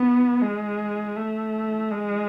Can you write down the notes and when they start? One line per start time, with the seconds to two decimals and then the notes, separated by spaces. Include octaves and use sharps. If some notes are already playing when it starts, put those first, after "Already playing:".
Already playing: B3
0.42 G#3
1.17 A3
1.91 G#3